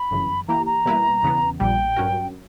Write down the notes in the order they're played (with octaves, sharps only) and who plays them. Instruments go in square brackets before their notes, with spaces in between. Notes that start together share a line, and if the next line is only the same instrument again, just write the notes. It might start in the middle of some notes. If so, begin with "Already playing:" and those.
Already playing: [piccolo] B5
[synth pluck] G1 F#2 C#3 E3
[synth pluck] E3 A#3 E4 G4 [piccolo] A#5
[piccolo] A#5
[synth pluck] B2 G3 A#3 E4 B4
E2 C#3 E3 B3
[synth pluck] A#1 A#2 G3 [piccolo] G5
[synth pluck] G2 F#3 C#4 F#4 A#4